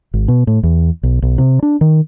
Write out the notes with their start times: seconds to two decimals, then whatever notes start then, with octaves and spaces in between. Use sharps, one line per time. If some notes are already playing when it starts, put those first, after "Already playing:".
0.14 G#1
0.28 B2
0.47 A2
0.63 E2
1.03 B1
1.22 B1
1.38 C3
1.62 D4
1.81 D#3